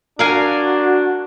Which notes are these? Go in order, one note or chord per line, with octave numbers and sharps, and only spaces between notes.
D4 F#4 A#4 F5 G#5